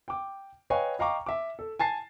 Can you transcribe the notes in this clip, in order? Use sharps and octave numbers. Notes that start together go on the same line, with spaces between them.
G5 D6
B4 C#5 D#5 F5 G5 G#5
D#5 F5 G5 A#5 C#6 D6
E5 D6
A4
G#5 A5 A6 C7